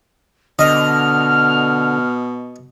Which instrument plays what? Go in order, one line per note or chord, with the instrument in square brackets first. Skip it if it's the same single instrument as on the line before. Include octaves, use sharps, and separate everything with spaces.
[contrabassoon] B2 [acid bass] D3 [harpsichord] D#5 [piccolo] F6